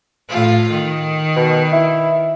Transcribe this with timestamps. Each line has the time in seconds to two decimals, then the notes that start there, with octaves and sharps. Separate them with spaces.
0.28 A2 F4
0.71 D#3
1.36 B2
1.72 E4